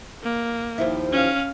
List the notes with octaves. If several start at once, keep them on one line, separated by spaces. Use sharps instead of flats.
A#3
D#2 F3 E4
C#4 F5